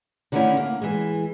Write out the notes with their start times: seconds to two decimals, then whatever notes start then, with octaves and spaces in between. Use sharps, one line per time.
0.32 D3 D#3 A3 C4 C#4 E4
0.57 A#3
0.81 E3 G#3